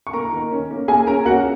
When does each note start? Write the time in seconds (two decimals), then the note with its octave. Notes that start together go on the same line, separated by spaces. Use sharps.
0.07 C#6
0.13 A#3 A#4 A#5
0.33 D#3
0.51 C#4
0.71 A#3
0.88 A#3 G#4 G#5
1.07 C#4 A#4 A#5
1.25 A#3 F#4 F#5